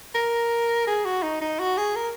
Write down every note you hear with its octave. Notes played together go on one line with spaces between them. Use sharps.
A#4
G#4
F#4
D#4
D#4
F#4
G#4
A#4